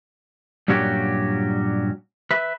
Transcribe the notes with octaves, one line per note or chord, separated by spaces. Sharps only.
G2 A#2 F#3 C#4 F#4 G4
B4 E5